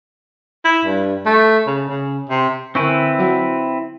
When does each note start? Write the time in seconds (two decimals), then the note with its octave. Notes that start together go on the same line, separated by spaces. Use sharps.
0.65 E4
0.85 G2
1.26 A3
1.67 C#3
1.89 C#3
2.30 C3
2.75 D3 C4 E4 B4 G#5 C#6
3.19 F#3 F#4 F#5